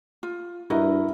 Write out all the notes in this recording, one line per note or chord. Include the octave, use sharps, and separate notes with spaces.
F4
G2 E4 F#4 A#4 D#5